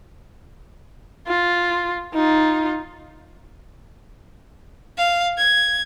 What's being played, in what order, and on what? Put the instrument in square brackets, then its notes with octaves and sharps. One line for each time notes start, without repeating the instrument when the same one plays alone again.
[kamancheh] F4
D#4 F4
[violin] F5
G#6